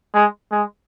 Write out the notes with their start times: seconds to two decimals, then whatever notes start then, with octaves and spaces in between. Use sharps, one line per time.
0.14 G#3
0.51 G#3